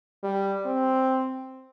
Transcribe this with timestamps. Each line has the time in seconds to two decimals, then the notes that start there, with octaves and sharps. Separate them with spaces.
0.23 G3
0.65 C4